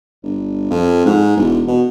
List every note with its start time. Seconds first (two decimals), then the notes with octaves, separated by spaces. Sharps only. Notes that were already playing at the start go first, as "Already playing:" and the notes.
0.23 G1
0.70 F2
1.06 G#2
1.37 E1
1.67 B2